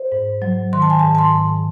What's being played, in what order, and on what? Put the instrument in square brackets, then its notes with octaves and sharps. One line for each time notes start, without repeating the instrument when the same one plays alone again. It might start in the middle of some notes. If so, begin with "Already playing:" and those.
Already playing: [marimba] C5
G#2
F#3
D#3 C6
A5
G#5
G#2 A5
A5
C6
G#2